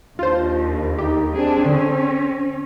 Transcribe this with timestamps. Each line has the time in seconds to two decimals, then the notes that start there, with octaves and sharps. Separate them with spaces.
0.19 D#2 D4 F4 C5
0.98 D#4 G4
1.34 C4 D4 G#4
1.66 D3 C#4